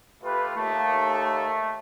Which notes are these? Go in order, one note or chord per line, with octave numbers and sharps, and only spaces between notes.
A3 F4 G4 B4
D#2 A3